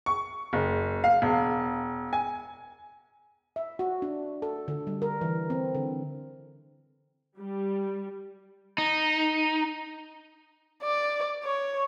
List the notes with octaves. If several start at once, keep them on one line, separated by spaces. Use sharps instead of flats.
C#6
F#1
F5
E1
G#5
E5
F#4
D4
A4
D3
G3
A#4
E3
C4
D3
G3
D#4
D5
C#5